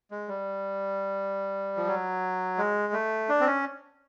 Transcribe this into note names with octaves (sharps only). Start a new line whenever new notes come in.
G#3
G3
F3
F#3
G#3
A3
D4
C4
C#4